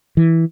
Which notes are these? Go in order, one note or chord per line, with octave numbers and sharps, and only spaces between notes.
E3